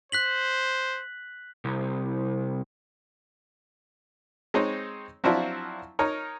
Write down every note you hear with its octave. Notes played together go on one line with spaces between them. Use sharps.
C5 F#6 B6 F#7
C2
G#3 C4 D#4 C#5
F3 F#3 C4 D4 E4 F4
D#4 A#4 C#5